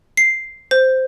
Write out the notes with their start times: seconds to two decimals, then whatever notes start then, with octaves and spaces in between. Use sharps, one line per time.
0.17 C7
0.71 C5